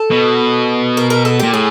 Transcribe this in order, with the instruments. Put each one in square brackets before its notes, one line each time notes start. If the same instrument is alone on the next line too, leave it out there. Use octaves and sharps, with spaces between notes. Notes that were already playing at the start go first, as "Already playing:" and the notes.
Already playing: [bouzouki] A4
[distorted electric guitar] B2
[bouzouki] A#4
A#4
A4
[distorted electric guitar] A#2 [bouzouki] G4
[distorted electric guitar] A2 [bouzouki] G#4